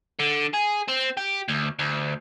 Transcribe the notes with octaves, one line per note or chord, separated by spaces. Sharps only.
D3
G#4
C4
G4
D2
D2